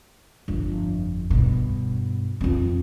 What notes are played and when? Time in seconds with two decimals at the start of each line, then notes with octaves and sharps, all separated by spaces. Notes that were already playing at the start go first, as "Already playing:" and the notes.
0.48 G1 F2
1.30 G2 B2
2.41 F2 C4